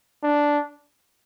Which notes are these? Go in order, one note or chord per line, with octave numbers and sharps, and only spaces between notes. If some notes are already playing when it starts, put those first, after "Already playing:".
D4